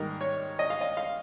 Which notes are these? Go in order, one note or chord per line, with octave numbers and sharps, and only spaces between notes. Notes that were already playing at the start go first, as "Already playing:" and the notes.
Already playing: G#2 D#3 G3 A#3 A#4
C#5
D#5
F5
D#5
F5